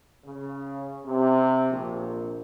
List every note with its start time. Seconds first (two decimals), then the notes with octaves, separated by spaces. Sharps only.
0.25 C#3
1.06 C3
1.70 A#1